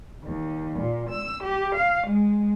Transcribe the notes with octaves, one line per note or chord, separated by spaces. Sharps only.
D#2
A#2
E6
G4
F5
G#3